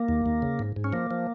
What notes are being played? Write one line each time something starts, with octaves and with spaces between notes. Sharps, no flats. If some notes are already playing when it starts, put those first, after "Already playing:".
Already playing: A#3
D#2
D#2
C#3
G#2
G#2
C#4
F3 A#3
F3